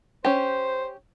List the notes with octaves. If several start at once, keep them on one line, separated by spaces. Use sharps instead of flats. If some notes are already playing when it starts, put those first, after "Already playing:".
C#4 G4 C5